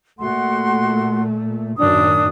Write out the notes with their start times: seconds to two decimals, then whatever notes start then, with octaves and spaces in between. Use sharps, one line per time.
0.21 A#2 A3 F#4 F#5 C6
1.78 F#2 A2 D#3 D4 D#6